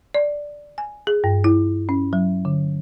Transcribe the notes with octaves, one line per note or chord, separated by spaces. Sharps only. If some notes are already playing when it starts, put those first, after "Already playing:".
D5
G#5
G#4
G2
E4
C#4
F#3
D3